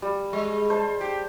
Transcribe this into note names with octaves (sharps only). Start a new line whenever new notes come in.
G3
G#3
C5 A5
G4